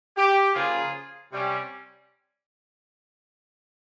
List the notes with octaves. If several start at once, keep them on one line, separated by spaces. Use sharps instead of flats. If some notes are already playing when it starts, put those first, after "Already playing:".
G4
C#3 F3 A#3 F4 G#4
C3 G3 C#4